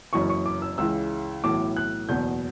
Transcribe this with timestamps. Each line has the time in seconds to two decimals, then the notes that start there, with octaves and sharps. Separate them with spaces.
0.13 F#1 F#2 E3 C#6
0.30 C#6
0.46 D6
0.62 E6
0.78 C#2 C#3 E3 E6
1.44 B1 A2 E3 D6
1.77 F#6
2.09 F#1 E2 B2 G6